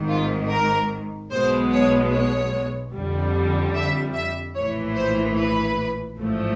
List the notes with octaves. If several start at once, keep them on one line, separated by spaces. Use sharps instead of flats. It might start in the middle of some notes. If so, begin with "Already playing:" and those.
Already playing: G#1 G#2 D#3
F4
A#4
B1 B2 G#3 B3 C5
C#5
C#5
F2 D3 G3
E5
E5
A#1 A2 E3 C#5
C5
B4
A1 G#2 F3 A3